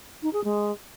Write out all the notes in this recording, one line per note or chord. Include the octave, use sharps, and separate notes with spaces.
D#4
G#4
G#3